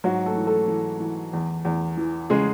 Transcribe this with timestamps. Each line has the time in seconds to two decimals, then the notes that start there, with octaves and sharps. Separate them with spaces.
0.04 G#2 F#3 F#4
0.26 A3 A4
0.36 E3
0.47 A3 A4
0.68 E3
1.00 E3
1.33 E2
1.65 E2
1.97 E3
2.30 C#3 G#3 G#4